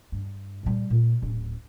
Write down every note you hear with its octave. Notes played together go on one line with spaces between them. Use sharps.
G2
A#2 G3
A#2
D1 C#4